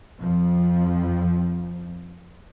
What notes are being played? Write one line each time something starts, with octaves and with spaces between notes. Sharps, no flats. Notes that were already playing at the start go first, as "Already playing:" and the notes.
F2 F3